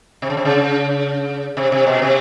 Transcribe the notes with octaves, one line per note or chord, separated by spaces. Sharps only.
C3
C#3
C3
C#3
C3
C3
B2
C3